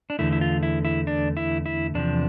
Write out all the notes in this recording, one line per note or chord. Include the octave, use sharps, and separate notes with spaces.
D4
E2 D3 A3 E4
E4
F4
E4
E4
D4
E4
E4
E2 C3 F3 D4